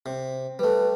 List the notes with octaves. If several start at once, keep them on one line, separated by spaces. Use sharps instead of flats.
C3
G3 A3 B4